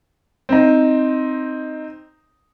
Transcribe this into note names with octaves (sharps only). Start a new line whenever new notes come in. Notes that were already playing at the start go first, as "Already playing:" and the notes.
C4 D#4